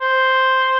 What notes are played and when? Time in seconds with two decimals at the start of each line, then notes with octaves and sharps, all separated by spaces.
0.01 C5